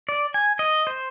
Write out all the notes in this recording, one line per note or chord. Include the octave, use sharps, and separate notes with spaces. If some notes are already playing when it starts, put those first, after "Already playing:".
D5
G#5
D#5
C5